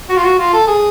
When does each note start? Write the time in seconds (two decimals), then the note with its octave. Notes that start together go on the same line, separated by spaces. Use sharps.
0.09 F#4
0.17 F4
0.24 F#4
0.38 F4
0.53 A4
0.67 G#4